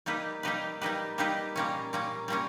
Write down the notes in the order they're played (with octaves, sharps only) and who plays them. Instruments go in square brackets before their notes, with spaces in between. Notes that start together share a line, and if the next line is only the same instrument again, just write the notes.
[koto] G3 A#3 D#4 G4 B4
G3 A#3 D#4 G4 B4
G3 A#3 D#4 G4 B4
G3 A#3 D#4 G4 B4
A#2 G3 A#3 C#4
A#2 G3 A#3 C#4
A#2 G3 A#3 C#4